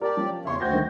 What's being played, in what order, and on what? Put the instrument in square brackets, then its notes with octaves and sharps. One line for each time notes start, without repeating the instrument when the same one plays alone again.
[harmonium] G4 D5 [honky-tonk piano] A#4 A5
[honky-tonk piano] F3 C#4
[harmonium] E2 C#3 C#5 [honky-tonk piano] E5 C6 C#6
[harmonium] D2 C4 F#4 [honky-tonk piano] G6 G#6 A#6
[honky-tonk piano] D#3